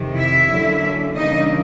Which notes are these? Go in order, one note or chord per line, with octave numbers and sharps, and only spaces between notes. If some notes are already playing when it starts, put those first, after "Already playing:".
Already playing: F2 C3 D#3
E4 E5
D3 F#3 A#3 C#4
C#3 E3 G3 A#3 D4 D#4 D#5